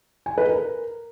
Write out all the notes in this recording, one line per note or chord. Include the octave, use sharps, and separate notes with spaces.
G#5
B4
A#4